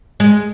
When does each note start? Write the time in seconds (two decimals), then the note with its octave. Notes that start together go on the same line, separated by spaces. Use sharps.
0.20 G#3